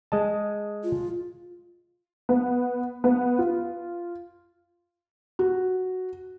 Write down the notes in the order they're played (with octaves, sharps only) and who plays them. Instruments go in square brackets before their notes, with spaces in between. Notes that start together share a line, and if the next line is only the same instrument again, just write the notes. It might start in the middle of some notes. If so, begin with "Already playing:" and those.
[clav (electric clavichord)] G#3 D#5 A5
[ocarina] F4
[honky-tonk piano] B3
B3
F4
[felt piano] F#4